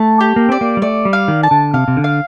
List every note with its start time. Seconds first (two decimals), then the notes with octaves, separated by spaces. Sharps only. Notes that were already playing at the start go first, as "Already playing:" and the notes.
Already playing: A3 A5
0.21 G4
0.36 A#3
0.49 C4 D5
0.61 A#3
0.77 G3
0.82 A3 D5
1.05 G3
1.13 F5
1.28 D#3
1.43 A5
1.51 D3
1.74 C3 F5
1.88 C3
1.97 D3
2.04 F5